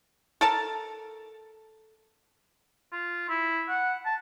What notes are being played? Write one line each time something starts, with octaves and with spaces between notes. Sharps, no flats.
A4 A#4 A5
F4
E4
F#5
A5